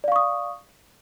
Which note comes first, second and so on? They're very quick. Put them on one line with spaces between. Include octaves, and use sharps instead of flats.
D5 F5 C#6 D#6